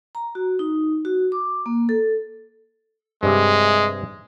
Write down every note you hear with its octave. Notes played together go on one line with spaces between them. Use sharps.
A#5
F#4
D#4
F#4
D6
A#3
A4
G2 C3 G#3